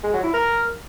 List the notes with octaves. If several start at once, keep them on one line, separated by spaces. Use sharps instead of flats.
G#3
F#3
E4
A#4